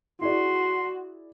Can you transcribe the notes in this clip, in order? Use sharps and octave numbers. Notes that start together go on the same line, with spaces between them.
E4 F#4 G#4 D5 C6